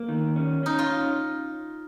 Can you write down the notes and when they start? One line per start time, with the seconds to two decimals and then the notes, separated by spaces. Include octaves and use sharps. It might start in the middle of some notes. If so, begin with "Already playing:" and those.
Already playing: A#3
0.08 D#3
0.36 C#4
0.63 C#4 D#4
0.79 F4